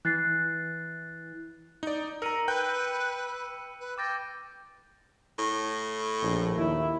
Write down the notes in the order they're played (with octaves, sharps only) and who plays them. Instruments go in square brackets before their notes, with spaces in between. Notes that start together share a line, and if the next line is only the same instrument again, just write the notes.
[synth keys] E3 [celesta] F#6 A6 C7
[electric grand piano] D#4 D5
[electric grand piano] A#4 A#5 [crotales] E6 C#7 D#7
[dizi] B4 [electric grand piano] G5 F#6 G6
[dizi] B4
[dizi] G5 [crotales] D6 A6 A#6
[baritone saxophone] A2
[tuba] A#1
[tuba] D#2 [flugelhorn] E4